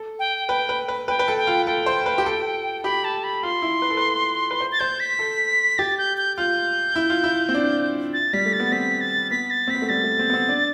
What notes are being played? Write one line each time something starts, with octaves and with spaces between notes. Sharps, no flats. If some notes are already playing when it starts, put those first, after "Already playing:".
Already playing: A4
G5
B4 G5
B4
B4
B4 G5
B4
A4
G5
F4
A4 G5
C5
B4
G4
A4
G4 B5
A5
B5
F4 C6
E4
B4
A4
B4
B4
C5
A6
C5 G6
B6
A4
G4 A6
G6
G6
F4 G6
E4
F4
E4
C4
D4
A6
G3 B6
A3
A6
B3
C4 B6
A6
B3 B6
A6
C4
B3 B6
A3
G3 A6
A3
C4
B3
C4
D4